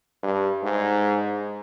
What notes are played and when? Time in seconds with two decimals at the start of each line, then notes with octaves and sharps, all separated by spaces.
0.23 G2
0.63 G#2